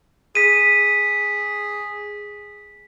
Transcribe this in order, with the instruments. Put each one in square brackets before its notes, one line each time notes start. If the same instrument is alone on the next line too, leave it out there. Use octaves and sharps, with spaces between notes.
[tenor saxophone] G#4 [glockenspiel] B6 D#7